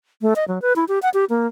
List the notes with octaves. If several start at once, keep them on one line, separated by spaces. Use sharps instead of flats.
A3
D#5
F#3
B4
E4
G4
F#5
G4
A#3